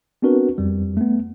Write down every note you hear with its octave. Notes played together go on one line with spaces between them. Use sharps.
B3 C4 D4 F#4 A#4 B4
F2 G3
A3 B3